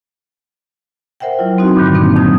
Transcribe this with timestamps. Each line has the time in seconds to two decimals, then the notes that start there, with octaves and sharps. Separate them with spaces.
1.20 A#4 C5 E5 F#5 G5
1.39 F#3 E4 F4
1.58 C4 D#4 F#4
1.76 G2 A#2 D3 D#3 G3
1.95 A#3 C4 D4 D#4
2.15 F2 D#3 F#3 C4 D#6